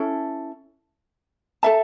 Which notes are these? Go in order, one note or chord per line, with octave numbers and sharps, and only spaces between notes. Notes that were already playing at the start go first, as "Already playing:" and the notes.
Already playing: C#4 E4 A4
A4 E5 A5